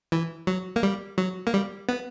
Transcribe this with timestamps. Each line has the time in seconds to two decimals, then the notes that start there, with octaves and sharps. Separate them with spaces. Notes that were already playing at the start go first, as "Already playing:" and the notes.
0.12 E3
0.47 F#3
0.76 A#3
0.83 G3
1.18 F#3
1.47 A#3
1.54 G3
1.89 B3